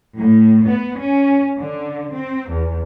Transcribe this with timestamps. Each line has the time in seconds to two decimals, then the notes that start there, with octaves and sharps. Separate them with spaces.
0.18 A2
0.67 B3
0.99 C#4
1.60 D3
2.13 C4
2.50 E2